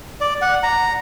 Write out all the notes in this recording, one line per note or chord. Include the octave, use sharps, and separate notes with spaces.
D5
F#5
A#5